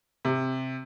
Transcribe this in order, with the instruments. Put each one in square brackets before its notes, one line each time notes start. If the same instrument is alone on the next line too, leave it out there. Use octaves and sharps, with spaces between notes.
[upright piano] C3